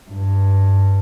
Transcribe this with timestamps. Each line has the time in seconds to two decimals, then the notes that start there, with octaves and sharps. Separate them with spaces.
0.11 G2